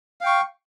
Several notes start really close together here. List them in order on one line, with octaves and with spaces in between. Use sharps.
F5 G5 C#6